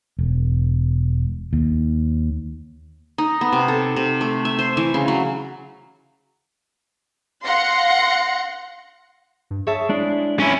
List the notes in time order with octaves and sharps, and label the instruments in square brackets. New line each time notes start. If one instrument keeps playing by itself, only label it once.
[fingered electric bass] E1
D#2
[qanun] D#4
B3
C3
A4
C3
A3
E5
C5
E3
C#3
F#3
[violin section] F5 F#5 C6 A#6 C#7
[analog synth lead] G2
[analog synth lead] G#4 [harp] C#5 E5 A5
[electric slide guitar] G#3 D4 E4
[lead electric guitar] C#4 E4 [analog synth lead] G#5